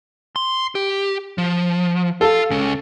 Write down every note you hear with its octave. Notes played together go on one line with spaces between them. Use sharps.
C6
G4
F3
F4 A4 F5
C#2 C#3